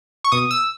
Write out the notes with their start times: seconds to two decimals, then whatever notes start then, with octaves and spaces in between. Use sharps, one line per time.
0.24 C#6
0.32 B2 D#6
0.51 E6